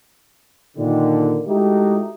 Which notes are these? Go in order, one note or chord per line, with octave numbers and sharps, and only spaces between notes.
A#2 D3 D#3
G#3 A3 D#4 E4 F#4 G4